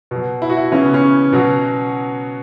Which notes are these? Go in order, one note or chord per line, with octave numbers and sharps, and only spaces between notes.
B2 F#3
E4
F#4
E4
C#3 E3 C#4
B3
C#4
B2 F#3